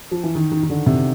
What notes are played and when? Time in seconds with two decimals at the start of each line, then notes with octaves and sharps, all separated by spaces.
0.11 F3
0.23 E3
0.35 D#3
0.52 D#3
0.63 D#3
0.70 D3
0.86 C3